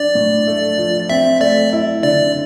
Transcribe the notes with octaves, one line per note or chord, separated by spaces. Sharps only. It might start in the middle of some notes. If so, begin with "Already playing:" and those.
Already playing: D4 D5
A2
A3
F3
C4 E5
A3 D5
E4
D3 D5